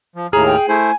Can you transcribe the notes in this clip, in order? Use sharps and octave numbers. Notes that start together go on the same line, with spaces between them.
F3
D#2 A2 G#4 A#5 F6
G5
A3 E4 C5 G#5